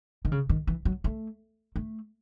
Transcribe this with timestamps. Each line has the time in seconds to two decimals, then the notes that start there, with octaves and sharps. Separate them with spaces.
0.25 D#3
0.32 C#3
0.49 D#3
0.67 E3
0.85 F#3
1.04 A3
1.76 A3